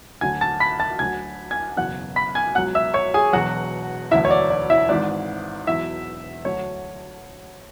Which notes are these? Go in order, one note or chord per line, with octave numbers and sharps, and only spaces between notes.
D2 D3 F#3 G#5 G#6
A5 A6
B5 B6
A5 A6
D2 D3 F#3 G#5 G#6
G#5 G#6
F#1 E2 B2 F#3 F#5 F#6
B5 B6
G#5 G#6
C#2 B2 F#3 F#5 F#6
E5 E6
C#5 C#6
G#4 G#5
E1 E2 B2 F#3 F#4 F#5
E1 D2 D3 F#3 E4 E5
C#5
D5
D5
E4 E5
G#1 G#2 E3 D5
E1 E2 B2 F#3 E4 E5
D2 D3 F#3 C#5